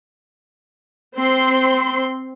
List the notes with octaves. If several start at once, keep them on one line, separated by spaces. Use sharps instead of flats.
C4 C6